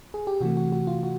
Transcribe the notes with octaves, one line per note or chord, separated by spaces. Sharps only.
G#4
G4
C3 E3 A3 F#4
F#4
F#4
F4
F#4